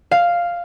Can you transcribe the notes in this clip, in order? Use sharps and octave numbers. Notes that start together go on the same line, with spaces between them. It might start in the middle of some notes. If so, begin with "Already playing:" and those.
F5